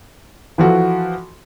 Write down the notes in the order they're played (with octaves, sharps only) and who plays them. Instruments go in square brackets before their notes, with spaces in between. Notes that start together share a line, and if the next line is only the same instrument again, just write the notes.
[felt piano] E3 F3 F#4 A4